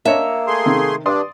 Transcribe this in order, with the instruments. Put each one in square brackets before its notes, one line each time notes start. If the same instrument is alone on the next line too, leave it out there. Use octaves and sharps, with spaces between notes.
[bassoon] A#3 [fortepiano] D4 C#5 D#5 [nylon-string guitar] E5
[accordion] A3 G#4 C6
[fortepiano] C3 D#3
[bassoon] G2 [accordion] D4 [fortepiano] D5 C6 D#6